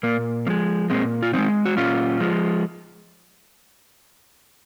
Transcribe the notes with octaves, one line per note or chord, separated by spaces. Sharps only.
A#2 A#3
F3 G#3 A#3
A#2 G#3 C4
F4
F3 G#3 C4 D#4
F#4
A#2 C#4 F4
F3 G#3